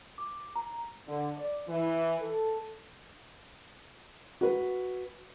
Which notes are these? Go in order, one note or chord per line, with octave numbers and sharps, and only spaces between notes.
D6
A#5
D3
D5
E3
A4
F#4 B4